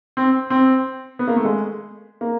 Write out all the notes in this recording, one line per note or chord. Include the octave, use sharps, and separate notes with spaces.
C4
C4
B3
A#3
A3
G#3
A#3